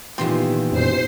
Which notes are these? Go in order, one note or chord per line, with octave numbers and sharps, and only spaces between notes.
A#2 D#3 E3 B3 F4 G4 G5 C6
F#2 B2 C5 C6